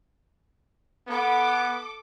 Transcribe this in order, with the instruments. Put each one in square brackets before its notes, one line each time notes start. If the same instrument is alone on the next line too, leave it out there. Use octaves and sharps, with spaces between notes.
[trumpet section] B3 [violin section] A4 D6